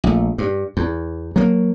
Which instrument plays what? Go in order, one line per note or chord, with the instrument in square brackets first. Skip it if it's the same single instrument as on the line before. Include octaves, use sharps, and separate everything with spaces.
[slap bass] A#1 A3
G2
E2
F#3 A#3